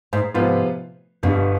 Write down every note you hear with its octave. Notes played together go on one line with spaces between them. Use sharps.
G#2
G#2 C3 F3 B3 F4
G1 G2 B2 D3 G3